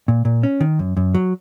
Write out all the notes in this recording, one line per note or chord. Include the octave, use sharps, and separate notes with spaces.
A#2
A#2
C#4
D#3
F#2
F#2
F#3